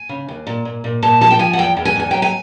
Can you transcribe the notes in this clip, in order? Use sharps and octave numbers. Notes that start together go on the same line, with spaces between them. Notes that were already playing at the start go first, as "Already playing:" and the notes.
Already playing: G#5
C#3
D#2
A#2
A#2
A#2
A#2 A5
F3 A5
G5
F3 G#5
F#5
E2 G5
E2
G#5
E2 G#5
F#3 G5
G#5